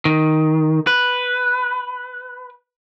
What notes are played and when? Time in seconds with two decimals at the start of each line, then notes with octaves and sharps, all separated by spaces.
0.05 D#3
0.87 B4